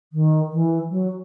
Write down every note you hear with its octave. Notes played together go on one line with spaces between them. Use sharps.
D#3
E3
F#3